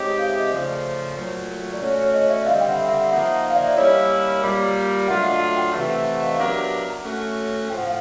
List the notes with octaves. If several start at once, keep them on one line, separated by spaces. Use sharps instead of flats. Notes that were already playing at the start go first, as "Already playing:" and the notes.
Already playing: G#3 C4 D#4 G4 C#5 D#5
F5
E5
D#5
C#3 F3 A3 C5 D5
A#2 F#3 A3
D5
A3 C#4 F#4 C#5
C#5
C#5 D#5
D5 E5
D3 G3 C4 D#5 F5
G5
E5 F#5
E5 F#5
F3 A#3 D#4 E5 F#5
F5
D5 E5
D5
G3 A#3 C#4 E4 C#5 D#5
A#2 G3 A#3
F#3 A3 D4 F4 E5 F#5
D#5 F5
E5 F#5
F5 G5
C3 E3 A3 E5 F#5
E5 F#5
E5 F#5
D#5 F5
F5
F#3 B3 D4 G4 A#4 E5 F#5
A3 C#4 F#4
A2 F3 G5
F#5
F5